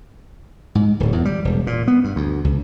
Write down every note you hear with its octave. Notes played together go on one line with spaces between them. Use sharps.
G#2
D1
E2
G3
E1
A#2
B3
G2
D2
C#2